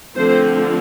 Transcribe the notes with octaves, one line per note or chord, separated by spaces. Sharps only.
D3 F3 A3 C4 C5